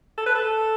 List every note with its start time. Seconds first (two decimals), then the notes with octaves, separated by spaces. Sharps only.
0.18 A4
0.26 B4
0.35 A4